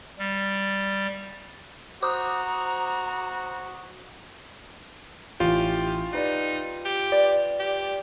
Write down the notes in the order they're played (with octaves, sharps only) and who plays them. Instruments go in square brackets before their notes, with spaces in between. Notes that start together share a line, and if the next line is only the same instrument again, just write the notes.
[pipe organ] G3
[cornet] F#4 [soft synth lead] C5 [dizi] A#5 [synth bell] D6 D#6
[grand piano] A1 E3 [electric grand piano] F4 [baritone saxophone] G4
[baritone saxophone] D#4 [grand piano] G4 B4 D5
[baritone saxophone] G4
[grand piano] B4 [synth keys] D5
[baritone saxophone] G4